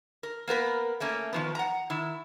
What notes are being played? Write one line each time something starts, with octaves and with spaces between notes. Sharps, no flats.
A#4
A#3 B3 A#4 B4
A3 A#3 C#4
D#3 F3 B3
F#5 A#5
D#3 E4